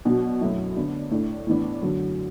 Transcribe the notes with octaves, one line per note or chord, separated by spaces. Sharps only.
B2 F#3 D4
F#2 F#3 A3 E4
D3 B3 D4
A2 A3 D4
A2 E3 B3 D4
F#2 D3 F#3